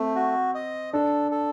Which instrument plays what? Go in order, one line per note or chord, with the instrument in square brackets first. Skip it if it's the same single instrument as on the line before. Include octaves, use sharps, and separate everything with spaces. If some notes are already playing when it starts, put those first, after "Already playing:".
Already playing: [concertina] A3 [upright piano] C4
[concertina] F#4
D#5
[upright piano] D4 [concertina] A4
[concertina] A4